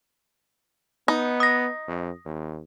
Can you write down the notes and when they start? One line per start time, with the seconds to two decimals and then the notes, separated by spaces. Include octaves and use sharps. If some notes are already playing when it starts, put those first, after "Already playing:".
1.08 B3 D#4
1.40 D#6 A#6
1.88 F2
2.26 D#2